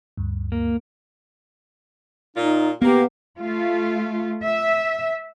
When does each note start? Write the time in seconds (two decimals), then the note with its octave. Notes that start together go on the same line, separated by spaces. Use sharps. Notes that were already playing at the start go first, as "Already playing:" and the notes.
0.17 D2 G2
0.52 A#3
2.37 A#2 D#4 F4
2.82 A#3 B3 G4
3.40 A3 F4
4.44 E5